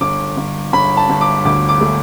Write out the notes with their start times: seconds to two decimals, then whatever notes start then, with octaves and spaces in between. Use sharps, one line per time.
0.01 G1 D6
0.37 G1
0.73 G1 B5
0.97 A5
1.09 G1
1.21 D6
1.45 D2 D6
1.69 D6
1.81 A3